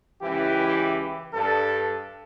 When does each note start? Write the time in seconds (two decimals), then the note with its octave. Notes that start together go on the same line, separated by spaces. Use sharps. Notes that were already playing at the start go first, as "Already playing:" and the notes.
0.22 C#2 E3 E4 G4
1.33 G2 A4